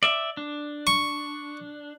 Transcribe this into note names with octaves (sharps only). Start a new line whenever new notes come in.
D5 E5
D4
C#6